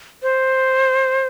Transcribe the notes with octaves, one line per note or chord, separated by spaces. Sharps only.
C5